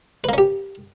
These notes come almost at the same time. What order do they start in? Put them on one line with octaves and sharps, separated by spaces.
B4 A#3 C#4 G4